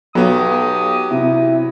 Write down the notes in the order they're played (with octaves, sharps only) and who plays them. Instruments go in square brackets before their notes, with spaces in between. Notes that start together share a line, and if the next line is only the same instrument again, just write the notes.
[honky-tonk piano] B1 [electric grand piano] F#3 B3 [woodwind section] G4 D#6
[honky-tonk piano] C3 [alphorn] E4